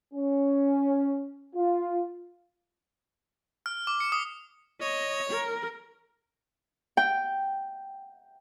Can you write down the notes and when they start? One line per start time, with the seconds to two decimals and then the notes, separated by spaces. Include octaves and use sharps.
0.14 C#4
1.56 F4
3.66 F6
3.87 D6
4.00 C#7
4.12 D#6
4.81 C#5 D#5
5.30 A#4
6.97 G5